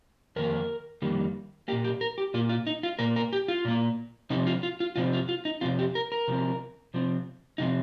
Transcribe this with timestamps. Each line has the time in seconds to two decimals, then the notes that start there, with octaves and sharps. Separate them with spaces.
0.36 F2 D#3 A#3 A#4
1.02 F2 D#3 G3 A#3
1.68 A#3 G4
1.72 A#2
1.84 G4
2.01 A#4
2.18 G4
2.34 A#2 A#3 F4
2.49 F4
2.67 D#4
2.83 F4
2.99 A#2 A#3 A#4
3.16 A#4
3.33 G4
3.48 F4
3.65 A#2 A#3
4.30 C3 F3 C4 D#4
4.47 F4
4.63 F4
4.80 F4
4.96 C3 F3 C4 F4
5.13 F4
5.29 F4
5.45 D#4
5.61 C3 F3 C4 F4
5.79 G4
5.95 A#4
6.12 A#4
6.28 C3 F3 C4
6.94 C3 F3 C4
7.58 C3 F3 C4 D#4